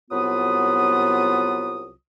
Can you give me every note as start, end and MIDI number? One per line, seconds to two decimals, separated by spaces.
0.11 1.92 36
0.11 1.92 54
0.11 1.92 59
0.11 1.92 65
0.11 1.92 71
0.11 1.92 87